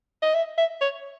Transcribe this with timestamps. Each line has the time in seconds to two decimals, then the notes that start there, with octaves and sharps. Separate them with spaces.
0.22 D#5
0.35 E5
0.58 E5
0.81 C#5